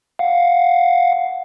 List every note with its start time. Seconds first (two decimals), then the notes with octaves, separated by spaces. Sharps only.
0.19 F5 F#5